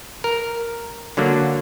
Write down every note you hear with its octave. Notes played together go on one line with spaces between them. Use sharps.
A#4
D3 F#3 A#3 D4